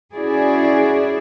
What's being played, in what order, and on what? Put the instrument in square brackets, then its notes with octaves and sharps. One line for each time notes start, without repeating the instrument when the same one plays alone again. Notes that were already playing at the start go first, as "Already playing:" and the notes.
[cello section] C#4 E4 F#4 G#4 D5